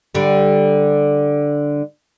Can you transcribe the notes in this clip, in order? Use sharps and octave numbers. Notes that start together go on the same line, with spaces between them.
D3 G3